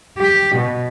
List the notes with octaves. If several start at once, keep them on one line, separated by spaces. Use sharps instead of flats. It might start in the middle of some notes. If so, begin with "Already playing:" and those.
G4
B2